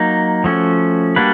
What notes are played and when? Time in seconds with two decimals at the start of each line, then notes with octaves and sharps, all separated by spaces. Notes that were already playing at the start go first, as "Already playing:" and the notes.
Already playing: F#3 A#3 D#4
0.44 F3 A3 C#4 F#4
1.16 G3 A#3 D4 F#4 B4